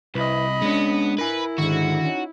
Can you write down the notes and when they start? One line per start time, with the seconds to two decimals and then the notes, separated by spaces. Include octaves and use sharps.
0.15 C2 C4 E4 B4 D#5 B5
0.62 G#3 B3 C#4 D4
1.18 E4 A#4 B4 G#5
1.58 G#2 D3 D#3 F#4
2.02 C#4 D#4